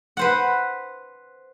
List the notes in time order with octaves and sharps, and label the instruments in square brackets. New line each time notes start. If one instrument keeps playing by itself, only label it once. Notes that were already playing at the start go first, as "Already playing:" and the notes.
[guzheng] B4 C5 F#5